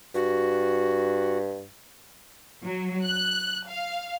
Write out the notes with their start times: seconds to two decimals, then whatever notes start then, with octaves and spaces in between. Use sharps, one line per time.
0.15 G2 F#4
2.63 F#3
3.05 F#6
3.69 F5